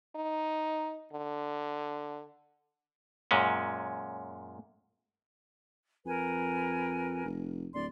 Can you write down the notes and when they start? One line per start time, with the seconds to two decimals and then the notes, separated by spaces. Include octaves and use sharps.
0.16 D#4
1.13 D3
3.31 F#2 A#2 G#3 C#4
6.05 F2 A#4 B4 G#5
7.25 F1
7.74 D1 D5 C6